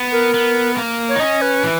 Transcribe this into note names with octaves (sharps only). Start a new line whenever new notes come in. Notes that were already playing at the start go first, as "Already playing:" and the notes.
Already playing: B3
A#4
B3
A#3
C#5
D#4
C#4 D#5
B4
E3